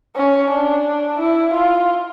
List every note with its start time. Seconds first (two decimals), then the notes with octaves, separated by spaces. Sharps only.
0.16 C#4
0.50 D4
1.19 E4
1.53 F4